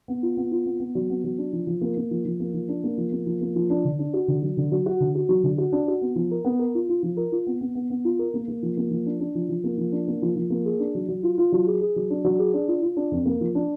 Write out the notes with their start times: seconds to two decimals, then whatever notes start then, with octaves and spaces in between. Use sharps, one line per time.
0.08 B3
0.23 F4
0.37 B3
0.52 F4
0.66 B3
0.80 B3
0.95 F#3
1.10 B3
1.24 F#3
1.38 D4
1.53 F3
1.67 F3
1.81 A#3
1.97 A#3
2.11 F3
2.25 F3
2.40 A#3
2.54 F3
2.69 D4
2.84 A#3
2.98 F3
3.12 A#3
3.26 F3
3.41 A#3
3.56 F3
3.70 D4
3.85 D3
3.99 D4
4.14 F#4
4.28 D3
4.42 F#3
4.57 D3
4.72 F#3
4.86 F#4
5.00 D3
5.15 F#4
5.29 F#3
5.43 D3
5.58 F#4
5.72 D4
5.88 F#4
6.01 B3
6.16 F3
6.31 A#4
6.45 B3
6.59 A#4
6.75 F4
6.89 F4
7.03 F3
7.17 A#4
7.32 F4
7.47 B3
7.61 B3
7.75 B3
7.90 B3
8.05 F4
8.19 A#4
8.34 A#3
8.48 A#3
8.63 F3
8.77 A#3
8.91 F3
9.06 D4
9.20 D4
9.35 F3
9.49 F3
9.64 A#3
9.78 F3
9.92 D4
10.08 A#3
10.22 F3
10.36 F3
10.50 A#3
10.65 G#4
10.80 D4
10.95 F#3
11.08 F#3
11.23 F4
11.38 F4
11.52 F#3
11.67 G#4
11.81 G#4
11.96 F#3
12.10 D4
12.25 F#3
12.39 G#4
12.54 D4
12.68 F4
12.83 F4
12.97 D4
13.11 F2
13.26 A#3
13.41 F3
13.55 D4